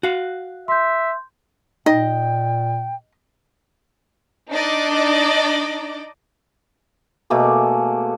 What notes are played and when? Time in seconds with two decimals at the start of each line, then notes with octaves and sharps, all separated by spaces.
0.03 F#4 F5
0.68 E5 C6 G6
1.86 A#2 D#4 D#5 G5
4.50 D4 D#4 D5 D#5 D6
7.30 B2 A3 A#3 G#4